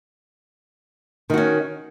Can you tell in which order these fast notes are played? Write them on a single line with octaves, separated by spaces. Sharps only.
D#3 F#4 C#4